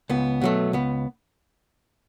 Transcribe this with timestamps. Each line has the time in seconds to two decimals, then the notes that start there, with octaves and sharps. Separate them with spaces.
0.09 C#2 B3
0.41 B2 F#3 A3
0.73 C#2 B3